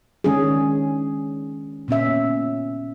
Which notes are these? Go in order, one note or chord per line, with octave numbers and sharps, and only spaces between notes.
D#3 G#3 C#4 D4 G#4
A#2 B3 C#4 E5